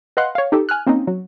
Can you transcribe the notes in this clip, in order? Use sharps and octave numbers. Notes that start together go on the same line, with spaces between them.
B4 D#5 F5 F#5 C6 F#6
C#5 F5
D#4 G4 A4
G#5 F6 F#6
A#3 C4 C#4 D#4
F#3